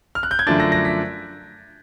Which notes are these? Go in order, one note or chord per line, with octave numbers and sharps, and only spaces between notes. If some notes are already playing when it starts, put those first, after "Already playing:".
F6
F#6
G6
G#6
F#2 D3 F3 A3 D4 A6
A#6
A#6
B6